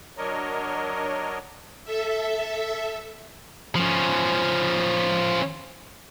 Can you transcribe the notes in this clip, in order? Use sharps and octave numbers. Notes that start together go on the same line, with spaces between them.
F#3 D4 A#4 C#5 D#5
A4 E5
F3 C#4